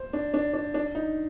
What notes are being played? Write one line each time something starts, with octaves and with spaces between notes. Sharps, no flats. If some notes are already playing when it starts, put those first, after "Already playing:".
Already playing: C5
D4
D4
D4
D4
D#4